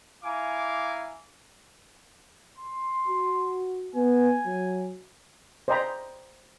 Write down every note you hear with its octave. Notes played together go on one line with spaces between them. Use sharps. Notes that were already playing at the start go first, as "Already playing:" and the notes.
E4 F5 G#5 A#5 D6
C6
F#4
B3 G#5
F#3
C5 D5 D#5 G5 A#5 B5